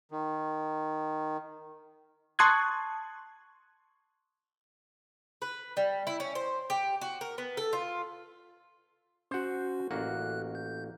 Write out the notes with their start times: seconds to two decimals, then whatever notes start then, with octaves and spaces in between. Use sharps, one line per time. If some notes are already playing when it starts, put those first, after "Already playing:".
0.11 D#3
2.39 A5 C6 C#6 D#6 F#6 G#6
5.42 B4
5.77 G3
6.07 E4
6.20 C#4
6.35 C5
6.70 G4
7.01 F#4
7.21 A#4
7.38 B3
7.57 A4
7.73 F4
9.31 C#4 F#4 C5 F#5
9.91 A1 A#3 F#4 F#6
10.55 G6